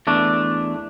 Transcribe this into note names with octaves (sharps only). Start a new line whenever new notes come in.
E2 A3 D4